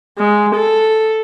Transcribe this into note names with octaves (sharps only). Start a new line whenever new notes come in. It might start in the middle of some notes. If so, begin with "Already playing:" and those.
G#3
A4